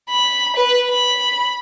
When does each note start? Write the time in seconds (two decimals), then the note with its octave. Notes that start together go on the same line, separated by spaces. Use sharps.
0.10 B5
0.56 B4
0.89 B5